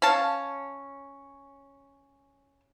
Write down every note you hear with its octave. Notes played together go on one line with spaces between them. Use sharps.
C#4 F5 A5